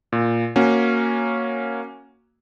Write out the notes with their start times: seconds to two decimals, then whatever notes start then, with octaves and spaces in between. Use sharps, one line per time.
0.12 A#2
0.56 A#3 C#4 F#4